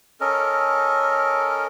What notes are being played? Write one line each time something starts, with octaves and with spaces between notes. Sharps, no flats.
C#4 A4 A#4 D#5